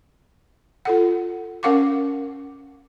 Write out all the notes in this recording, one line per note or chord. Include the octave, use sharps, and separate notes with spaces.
F4 A4 F#5
C#4 A#4 F5 F#5 C#6 D6